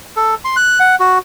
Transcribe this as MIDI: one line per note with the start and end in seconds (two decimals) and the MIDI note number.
0.16 0.35 69
0.45 0.56 84
0.56 0.79 90
0.80 0.96 78
1.00 1.18 66